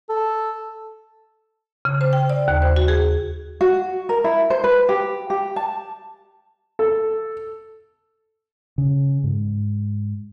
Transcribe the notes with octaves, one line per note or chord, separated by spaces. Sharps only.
A4
C#3
C5
G5
D5
D#2
C5
F#4
G#4
F#4
A#4
E4
C5
B4
G4
G4
A5
A4
C#3
G#2